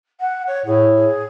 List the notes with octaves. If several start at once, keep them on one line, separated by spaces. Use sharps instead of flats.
F#5
C#5
A2 G#4
G#4